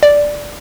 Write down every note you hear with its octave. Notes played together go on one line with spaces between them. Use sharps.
D5